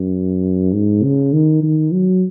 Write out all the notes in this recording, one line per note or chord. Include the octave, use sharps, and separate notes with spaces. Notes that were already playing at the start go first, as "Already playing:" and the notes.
Already playing: F#2
G#2
C#3
D#3
D#3
F#3